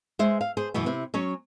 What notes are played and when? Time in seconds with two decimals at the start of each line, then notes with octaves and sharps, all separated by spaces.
0.19 G#3 C5 E5
0.41 F5
0.57 G#4 C5
0.74 F#2 B2 E3 B3
0.86 C3 E4
1.14 F#3 C#4 C#5